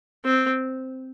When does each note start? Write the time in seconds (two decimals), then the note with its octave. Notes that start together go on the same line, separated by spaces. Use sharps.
0.25 C4